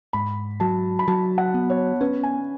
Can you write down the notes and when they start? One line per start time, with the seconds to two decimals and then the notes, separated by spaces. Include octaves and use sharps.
0.13 G#2 B5
0.60 F#3 A5
0.99 B5
1.08 F#3 A5
1.38 F#5
1.54 B3
1.70 C#5
2.01 C#4 B4
2.23 G#5